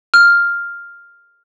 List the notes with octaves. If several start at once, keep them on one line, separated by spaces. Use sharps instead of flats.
F6